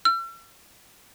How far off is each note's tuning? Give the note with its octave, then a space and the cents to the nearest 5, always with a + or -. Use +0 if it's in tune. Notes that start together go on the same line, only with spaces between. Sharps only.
E6 +45